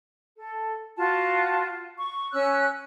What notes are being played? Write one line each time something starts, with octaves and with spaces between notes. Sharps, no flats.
A4
F4 F#4 A5
C#6
C#4 C#5 E6 F#6